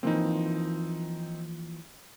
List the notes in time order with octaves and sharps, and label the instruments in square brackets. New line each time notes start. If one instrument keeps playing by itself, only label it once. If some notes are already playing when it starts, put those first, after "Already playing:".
[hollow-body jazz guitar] E3 F3 A#3 [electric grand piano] C4 D#4